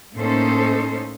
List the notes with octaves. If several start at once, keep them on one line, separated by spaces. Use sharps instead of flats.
A2 A#3 C#4 D#4 A4 C5